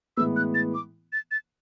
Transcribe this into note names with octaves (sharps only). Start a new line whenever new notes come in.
A2 E3 G#3 B3 E6
F#6
A6
D6
A6
A6